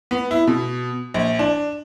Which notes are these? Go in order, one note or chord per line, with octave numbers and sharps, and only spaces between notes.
B3
E4
B2
A#1
D4